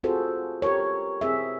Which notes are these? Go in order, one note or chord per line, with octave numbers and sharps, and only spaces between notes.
C4 F4 F#4 G#4 A4 C5
G4 A4 A#4 C#5
C4 G#4 E5